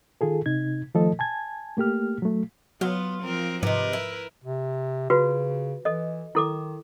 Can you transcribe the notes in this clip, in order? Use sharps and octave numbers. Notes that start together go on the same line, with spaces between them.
D#3 F4 G#4 A4
C3 D#4 G#6
D#3 F3 A3 A4 D#5
G#5 A5 G#6
A3 A#3 G4 F6
F#3 A3
F#3 B3 F4
F3 C4 A#4
G#2 C3 D#3 F3 A#4 B4
E4
C3
C#3 F4 F#4 B4
E3 A4 D#5
D#3 E4 A4 D6